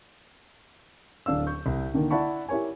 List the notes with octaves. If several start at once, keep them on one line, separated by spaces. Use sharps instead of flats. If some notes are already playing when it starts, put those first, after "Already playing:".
D1 D4 F5 E6
C#6 G6
C2
D3 D#3 A#3
E4 D5 F#5 A5 B5 C#6
E4 G4 A#4 C#5 G#5